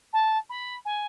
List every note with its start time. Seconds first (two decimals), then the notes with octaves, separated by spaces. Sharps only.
0.13 A5
0.50 B5
0.85 G#5